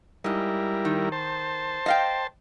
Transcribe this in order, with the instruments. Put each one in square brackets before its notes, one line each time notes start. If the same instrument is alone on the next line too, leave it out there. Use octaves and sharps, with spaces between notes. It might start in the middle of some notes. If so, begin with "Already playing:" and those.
[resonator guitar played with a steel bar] G#2 D#5 [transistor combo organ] G3 E4 A#4
[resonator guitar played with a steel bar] D#3
[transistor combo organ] C5 A5
[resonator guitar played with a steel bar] D#5 F5 G5